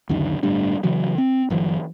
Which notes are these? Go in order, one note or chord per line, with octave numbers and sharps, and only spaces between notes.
C#2 F#2 D3 D#3
G1 A2 G3 D4
C#3 E3 F#3
C4
G1 E3 F#3